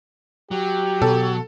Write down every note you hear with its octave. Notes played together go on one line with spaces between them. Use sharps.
F#3 G4
B2 A4